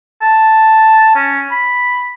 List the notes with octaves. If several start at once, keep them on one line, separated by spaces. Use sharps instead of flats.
A5
C#4
B5